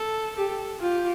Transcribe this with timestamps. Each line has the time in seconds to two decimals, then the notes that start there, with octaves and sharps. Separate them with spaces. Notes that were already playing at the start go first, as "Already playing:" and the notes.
Already playing: A4
0.36 G4 A4
0.80 F4 G4